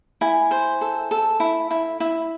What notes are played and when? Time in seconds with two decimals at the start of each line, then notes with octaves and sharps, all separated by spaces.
0.21 E4 G#5
0.51 C5
0.81 A4
1.11 A4
1.40 E4
1.71 E4
2.00 E4